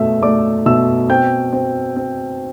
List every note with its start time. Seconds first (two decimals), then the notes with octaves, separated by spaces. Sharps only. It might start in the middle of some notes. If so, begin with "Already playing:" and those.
Already playing: B2 A3 E5 E6
0.22 A3 D5 D6
0.66 B2 E5 E6
1.09 C4 G5 G6
1.53 C4
1.96 C4